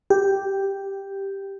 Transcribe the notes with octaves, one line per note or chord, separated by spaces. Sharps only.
G4